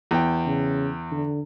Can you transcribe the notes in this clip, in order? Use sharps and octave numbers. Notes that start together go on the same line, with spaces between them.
E2 G5
C#3
D3